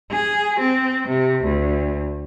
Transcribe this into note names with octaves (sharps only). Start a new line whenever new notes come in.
G#4
C4
C3
D2